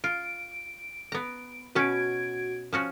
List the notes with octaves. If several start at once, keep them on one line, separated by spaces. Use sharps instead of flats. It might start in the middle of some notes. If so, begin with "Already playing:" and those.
F4 D7
B3 A#5
B2 C#4 F#4 B4 G#6 D7
F3 C#4 F#4